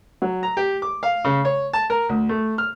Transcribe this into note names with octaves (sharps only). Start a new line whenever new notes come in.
F#3
A#5
G4
D6
F5
C#3
C#5
A5
A#4
D2
A3
F6